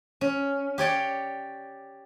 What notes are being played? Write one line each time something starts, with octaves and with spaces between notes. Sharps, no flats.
C#4
G4 C#5 D5 G5